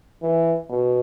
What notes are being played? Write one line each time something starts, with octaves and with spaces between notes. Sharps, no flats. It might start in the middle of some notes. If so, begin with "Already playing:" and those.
E3
B2